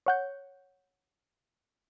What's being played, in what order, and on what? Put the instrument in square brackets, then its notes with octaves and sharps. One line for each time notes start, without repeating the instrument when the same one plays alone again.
[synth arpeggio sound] C#5 F#5 G6